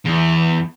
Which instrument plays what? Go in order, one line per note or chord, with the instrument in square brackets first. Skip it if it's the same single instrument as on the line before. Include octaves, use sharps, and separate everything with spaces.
[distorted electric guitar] E2